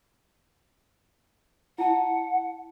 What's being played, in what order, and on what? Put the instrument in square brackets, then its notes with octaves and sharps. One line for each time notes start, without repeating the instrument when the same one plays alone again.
[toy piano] E4 A5 [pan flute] F#5